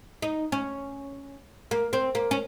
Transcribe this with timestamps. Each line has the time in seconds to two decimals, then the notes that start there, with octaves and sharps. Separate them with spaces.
0.22 D#4
0.52 C#4
1.71 A#3
1.93 C4
2.15 A#3
2.31 C#4